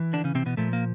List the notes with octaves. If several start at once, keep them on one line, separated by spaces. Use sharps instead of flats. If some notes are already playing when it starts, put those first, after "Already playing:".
Already playing: E3
D3 D4
C#3 C#4
C3 C4
B2 B3
A#2 F3 A3
A#3